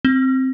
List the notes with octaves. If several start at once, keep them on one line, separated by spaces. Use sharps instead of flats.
C4